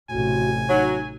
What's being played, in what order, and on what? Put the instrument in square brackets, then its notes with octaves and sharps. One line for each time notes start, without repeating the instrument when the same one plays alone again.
[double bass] A1 C3 [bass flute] F#4 [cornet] G#5
[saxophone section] F#3 [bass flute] D#4